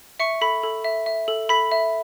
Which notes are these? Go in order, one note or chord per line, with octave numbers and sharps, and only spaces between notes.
E5 C#6 C#7
A4 B5 B6
A4
E5
E5
A4
A4 B5 B6
E5